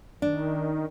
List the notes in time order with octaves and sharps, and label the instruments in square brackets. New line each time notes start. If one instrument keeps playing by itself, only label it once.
[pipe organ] D#3 [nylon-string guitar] D4